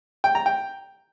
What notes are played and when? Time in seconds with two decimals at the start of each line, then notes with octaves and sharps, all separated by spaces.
0.24 G5
0.35 A#5
0.46 G5